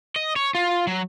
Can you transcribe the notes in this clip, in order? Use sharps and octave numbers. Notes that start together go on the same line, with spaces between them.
D#5
C#5
F4
F#3